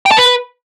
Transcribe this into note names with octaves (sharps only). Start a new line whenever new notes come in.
G5
A5
B4